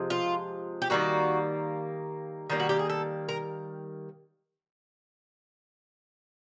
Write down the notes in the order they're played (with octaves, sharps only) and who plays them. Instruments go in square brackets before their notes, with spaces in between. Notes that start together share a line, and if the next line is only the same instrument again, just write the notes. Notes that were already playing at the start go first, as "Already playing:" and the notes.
Already playing: [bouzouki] C3 F3 G#3
F4
G4
D#3 G3 A#3 F#4
D#3 G3 A#3 F4
F#4
G4
G#4
A4
A#4